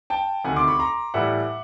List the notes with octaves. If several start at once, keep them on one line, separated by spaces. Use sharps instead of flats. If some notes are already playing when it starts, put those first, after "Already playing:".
G5 A5
D2 C3 D#3 F#5 G#5
C6 D6
B5 C#6
A#5 C6
A2 E3 G3 E5 F#5